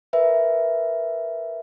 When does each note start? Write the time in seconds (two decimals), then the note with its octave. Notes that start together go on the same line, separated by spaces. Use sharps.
0.13 A#4 B4 E5